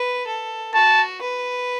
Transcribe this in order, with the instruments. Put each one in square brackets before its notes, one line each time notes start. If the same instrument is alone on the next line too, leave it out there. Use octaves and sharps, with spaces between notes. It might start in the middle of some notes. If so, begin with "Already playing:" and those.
Already playing: [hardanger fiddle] B4
A4
[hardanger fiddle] F#4 [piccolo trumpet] A5
[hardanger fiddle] B4